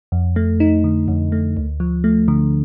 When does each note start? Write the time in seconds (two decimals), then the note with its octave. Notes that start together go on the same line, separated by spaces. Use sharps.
0.12 F2
0.36 A3
0.60 D#4
0.84 D3
1.08 F2
1.32 A3
1.57 D2
1.80 F3
2.04 A3
2.28 D3